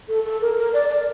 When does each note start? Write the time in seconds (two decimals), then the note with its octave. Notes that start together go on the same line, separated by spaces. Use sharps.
0.09 A4
0.25 A4
0.41 A#4
0.58 A#4
0.74 D5
0.90 D5